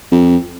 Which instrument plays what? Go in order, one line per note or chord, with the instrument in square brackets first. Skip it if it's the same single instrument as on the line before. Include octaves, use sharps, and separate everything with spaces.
[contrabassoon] F2